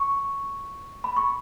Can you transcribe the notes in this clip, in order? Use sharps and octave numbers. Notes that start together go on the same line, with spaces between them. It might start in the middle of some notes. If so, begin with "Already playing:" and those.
Already playing: C#6
B5
C#6